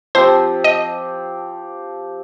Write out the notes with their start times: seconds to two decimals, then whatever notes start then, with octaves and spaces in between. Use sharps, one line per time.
0.15 F3 C4 G4 C5
0.64 D#5